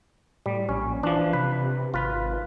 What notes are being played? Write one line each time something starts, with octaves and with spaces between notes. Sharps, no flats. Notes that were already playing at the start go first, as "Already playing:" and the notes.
A2 G3
A#1 C#4
E3 F3 D4
C3 B4
G#1 F4 B4